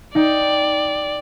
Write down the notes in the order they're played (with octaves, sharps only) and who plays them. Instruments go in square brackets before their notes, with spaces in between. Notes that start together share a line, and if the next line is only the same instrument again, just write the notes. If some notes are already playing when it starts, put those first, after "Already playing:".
[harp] D#4 G5 [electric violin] D5